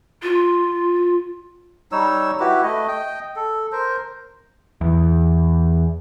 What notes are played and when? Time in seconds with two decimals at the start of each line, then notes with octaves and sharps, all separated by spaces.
0.23 F4
1.92 G3 D#4 C#5 E6
2.40 E4 F#4 G4 B4
2.63 A3 D#5
2.88 D#5 G5
3.36 A4
3.72 A#4 C5
4.81 E2